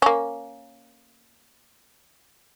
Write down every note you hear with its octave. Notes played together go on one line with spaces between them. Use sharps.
A#3 C#4